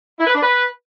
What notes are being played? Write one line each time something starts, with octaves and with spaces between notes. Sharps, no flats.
E4
B4
D4
B4